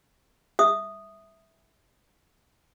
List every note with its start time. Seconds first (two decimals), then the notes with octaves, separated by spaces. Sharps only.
0.59 E5 D#6